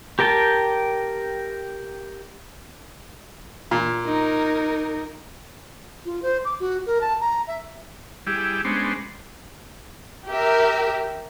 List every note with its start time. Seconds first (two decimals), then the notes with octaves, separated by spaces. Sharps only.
0.19 G4 A#4 G5 A5
3.71 A#2
4.06 D#4 A#4
6.05 F4
6.22 C5
6.45 D6
6.60 F#4
6.86 A#4
7.01 A5
7.21 A#5
7.47 E5
8.27 G3 E4 G4 G#4
8.65 G#3 B3 C#4 D4 C5
10.28 G4 A#4 E5